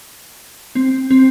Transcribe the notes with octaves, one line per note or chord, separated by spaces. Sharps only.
C4
C4